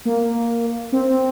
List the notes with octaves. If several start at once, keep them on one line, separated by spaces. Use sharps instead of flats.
A#3
C4